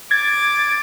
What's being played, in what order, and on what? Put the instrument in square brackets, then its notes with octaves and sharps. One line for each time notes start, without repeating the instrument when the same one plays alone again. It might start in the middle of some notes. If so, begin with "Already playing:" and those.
[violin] D6 [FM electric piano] G#6 A6